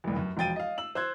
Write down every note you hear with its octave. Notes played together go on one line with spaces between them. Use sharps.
F1 C2
F#2
E1 F3 G5 A6 D#7
D#5 F5
E6 F#7
C5 E6 F#6 G#6